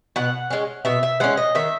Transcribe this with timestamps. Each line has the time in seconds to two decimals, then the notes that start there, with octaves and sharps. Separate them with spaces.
0.16 B2 F#5
0.50 G#3 C#4
0.85 B2 E5
1.03 E5
1.20 G#3 C#4 F#5
1.37 D#5
1.55 D#3 E5